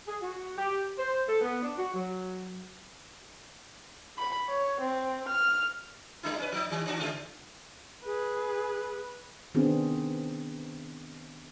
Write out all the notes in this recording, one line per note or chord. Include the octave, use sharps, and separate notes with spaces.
G#4
F#4
G4
C5
A4
B3
D4
F#4
F#3
B5
C#5
C4
F6
G3 D4 E4
C#4 B4
F3 D#4
D#3 G3
D#3 D4 F#4
C#3 G#3 F4
G#4 B4
D#3 B3 C4 D4 F#4 G#4